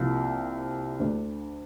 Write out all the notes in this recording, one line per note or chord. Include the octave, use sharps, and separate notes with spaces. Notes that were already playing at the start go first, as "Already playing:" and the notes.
Already playing: C2 C3 F3 A#3
D2 D3 A3 D4